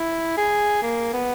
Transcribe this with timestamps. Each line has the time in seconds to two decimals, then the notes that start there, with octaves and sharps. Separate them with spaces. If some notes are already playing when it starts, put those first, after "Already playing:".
Already playing: E4
0.37 G#4
0.83 A#3
1.13 B3